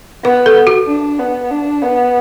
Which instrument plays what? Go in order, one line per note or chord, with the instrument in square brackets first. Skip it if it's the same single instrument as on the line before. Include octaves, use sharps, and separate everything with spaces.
[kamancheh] B3 [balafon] B4
[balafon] A4
F#4
[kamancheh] D4
B3
D4
B3